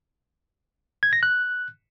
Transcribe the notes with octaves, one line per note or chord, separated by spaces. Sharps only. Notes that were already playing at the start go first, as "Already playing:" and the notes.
G#6
A#6
F#6